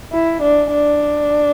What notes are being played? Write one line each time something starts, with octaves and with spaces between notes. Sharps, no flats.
E4
D4
D4